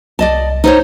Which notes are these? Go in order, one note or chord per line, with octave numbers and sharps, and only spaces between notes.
C2 D5 D#5 A5
D#4 C5 C#5